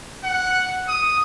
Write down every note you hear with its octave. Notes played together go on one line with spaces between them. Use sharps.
F#5
D#6